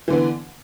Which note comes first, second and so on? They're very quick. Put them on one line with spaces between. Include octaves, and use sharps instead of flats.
E3 D3 B3